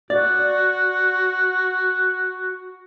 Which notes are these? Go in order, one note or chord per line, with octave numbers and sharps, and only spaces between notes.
F#4 D5